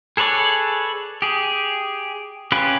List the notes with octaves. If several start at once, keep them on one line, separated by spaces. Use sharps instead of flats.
G#4 A4 B4 C#5 D5
G4 G#4
C#4 F4 G4 B4